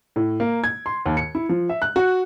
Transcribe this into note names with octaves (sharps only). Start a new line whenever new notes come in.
A2
A#3
G#6
C6
D#2
C#7
E4
F3
E5
F#6
F#4